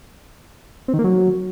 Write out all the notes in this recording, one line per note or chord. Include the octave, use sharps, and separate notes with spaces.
C4
D#3
A#3
F#3